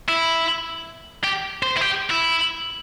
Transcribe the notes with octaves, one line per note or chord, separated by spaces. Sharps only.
E4
G4
C5
E4
G4
E4